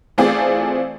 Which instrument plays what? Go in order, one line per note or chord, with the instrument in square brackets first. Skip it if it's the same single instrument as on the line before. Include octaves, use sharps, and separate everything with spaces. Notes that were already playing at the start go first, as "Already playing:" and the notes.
[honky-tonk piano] E3 A3 C4 F4 G#4 D5